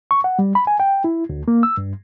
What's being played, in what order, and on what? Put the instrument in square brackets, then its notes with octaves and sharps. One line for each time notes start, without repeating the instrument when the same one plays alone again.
[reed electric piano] C#6
F#5
G3
B5
G#5
G5
E4
D2
A#3
E6
G2